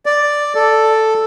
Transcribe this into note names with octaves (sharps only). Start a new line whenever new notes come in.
D5
A4